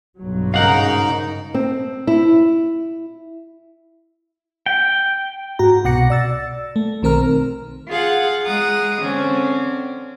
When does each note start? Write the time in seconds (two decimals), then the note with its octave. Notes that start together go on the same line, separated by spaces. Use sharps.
0.19 B1 G2 F#3
0.54 G#2 C#3 D#4 A#4 F5 F#5
1.54 C4
2.07 E4
4.66 G5
5.59 G#2 F#4 A#5
5.84 C2 B2 F#5 D6 A#6 C#7
6.10 D5 E6 A6
6.76 A3
7.03 B1 D#3 C4 A#4 A#5 F6
7.88 F4 G#4 F5 F#5
8.46 G#3 G#4 F#5 A#5 D#6
9.02 D3 C4 C#4